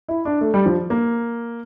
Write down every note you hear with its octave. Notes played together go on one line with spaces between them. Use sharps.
E4
D4
A3
G3
F3
A#3